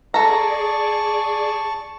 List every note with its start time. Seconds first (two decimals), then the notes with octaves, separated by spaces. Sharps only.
0.14 G#4 A4 D5 A5 A#5 C#6